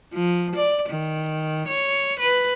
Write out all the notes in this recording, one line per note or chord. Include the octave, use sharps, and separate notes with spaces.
F3
D5
D#3
C#5
B4